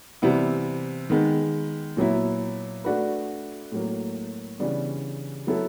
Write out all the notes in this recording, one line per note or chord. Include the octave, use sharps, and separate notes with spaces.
C3 E3 G3 B3 E4
D#3 G#3 B3
A#2 F#3 B3 E4
A3 D4 F#4 B4
A2 F#3 A#3
C#3 E3 G3 B3 D4
F#3 B3 E4 A4